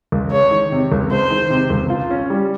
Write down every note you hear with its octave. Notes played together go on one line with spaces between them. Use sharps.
C#2
G#3 C#5
D#3
C3
C#2
G#3 C5
D#3
C3
C#2
F4
C#4
G3